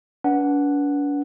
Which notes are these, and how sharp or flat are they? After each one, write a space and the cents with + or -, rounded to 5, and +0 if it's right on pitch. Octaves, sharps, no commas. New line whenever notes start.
D4 -40 B4 -20 F#5 +0